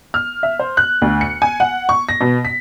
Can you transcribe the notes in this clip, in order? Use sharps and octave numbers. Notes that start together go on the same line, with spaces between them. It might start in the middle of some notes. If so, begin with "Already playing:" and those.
F6
E5
C5
F#6
D2
C#7
G#5
F#5
C#6
A#6
B2
B6